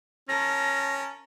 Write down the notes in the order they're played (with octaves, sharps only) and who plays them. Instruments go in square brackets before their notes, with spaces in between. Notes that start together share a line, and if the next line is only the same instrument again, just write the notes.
[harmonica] C#4 [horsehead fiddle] A#4 A5 [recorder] A#6